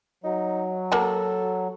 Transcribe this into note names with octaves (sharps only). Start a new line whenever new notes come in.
F#3 D#4
A#3 F#4 A4 A5